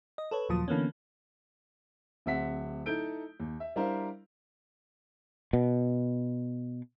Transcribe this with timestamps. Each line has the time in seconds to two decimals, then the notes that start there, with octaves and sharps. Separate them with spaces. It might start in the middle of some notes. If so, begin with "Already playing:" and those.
0.18 D#5
0.31 A4 B4 C#5
0.49 D#2 A#2 F3 F#3 A5 D#6
0.68 D3 E3 A#3 B3 C#4
2.26 D1 C4 E5 F#5 B6
2.86 D#4 E4 A4 G6 D7
3.40 D#2
3.60 E5
3.76 G3 D4 E4 A#4 C5 F5
5.53 B2